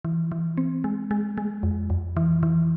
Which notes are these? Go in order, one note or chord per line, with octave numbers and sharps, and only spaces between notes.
E3
E3
C4
G#3
G#3
G#3
F2
F2
E3
E3